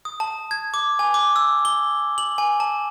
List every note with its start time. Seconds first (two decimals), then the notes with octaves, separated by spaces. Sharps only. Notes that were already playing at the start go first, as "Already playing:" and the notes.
0.05 D#6
0.20 A5
0.51 G#6
0.74 D6
0.99 G#5
1.14 D6
1.36 E6
1.65 G7
2.18 F#7
2.38 G#5
2.60 A5